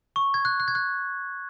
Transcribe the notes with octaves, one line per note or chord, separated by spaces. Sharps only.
C#6
G#6
F#6
F#6
G#6
F#6